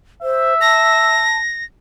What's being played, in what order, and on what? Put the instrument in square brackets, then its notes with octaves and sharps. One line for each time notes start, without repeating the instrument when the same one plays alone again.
[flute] C5 [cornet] E5
[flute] A5 [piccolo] A#6